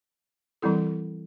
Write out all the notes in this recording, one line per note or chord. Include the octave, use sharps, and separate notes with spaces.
E3 G3 C4 E4 A4